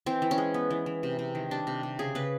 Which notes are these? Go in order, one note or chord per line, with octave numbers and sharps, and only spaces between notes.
E3 C4
E3
C#4
G#3
B3
E3
E3
C3
C3
D#3
G3 D4
C3
C3
C#3 G#4
C#3 B4